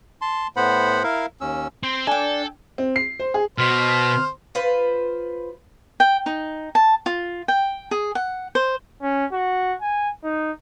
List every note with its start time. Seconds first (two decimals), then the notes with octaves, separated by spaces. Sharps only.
0.21 A5 C6
0.56 A2 B3 C5 F#5 B5
1.03 E4 A#4 F5
1.41 D#2 C#4 E6
1.83 C4 C6
2.07 D4 A4 G5 G#5
2.78 C4
2.96 C7
3.19 C5
3.34 G#4
3.58 B2 C5 F6
4.55 F4 B4 C5
6.00 G5
6.26 D#4
6.75 A5
7.06 F4
7.48 G5
7.91 G#4
8.15 F#5
8.55 C5
9.02 C#4
9.32 F#4
9.81 G#5
10.24 D#4